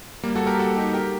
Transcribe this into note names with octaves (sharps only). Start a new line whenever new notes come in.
G3 A#3
F#4 A4
G4 A#4
F#4 A4
D#4 G4
G4 A#4